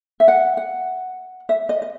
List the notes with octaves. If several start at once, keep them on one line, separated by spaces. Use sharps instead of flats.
E5
F#5
F#5
E5
D#5
D#5